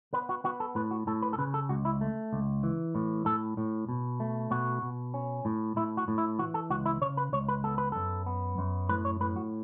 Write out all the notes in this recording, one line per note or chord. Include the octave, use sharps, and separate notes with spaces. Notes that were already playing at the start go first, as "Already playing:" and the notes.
B3 B4
F#4
B3 F#4
A4
A2 B4
F#4
A2 A4
B4
A4
C#3 B4
A4
C#2 F#4
E4
A3
C#2
E3
A2
A2 A4
A2
B2
A3
B2 F#4
B2
C#4
A2
A2 E4
F#4
A2
E4
E3 F#4
A4
C#2 F#4
E4
C#3 C#5
B4
C#2 C#5
B4
B3 A4
B4
F#2 A4
B3
F#2
A2 B4
C#5
A2 B4
F#4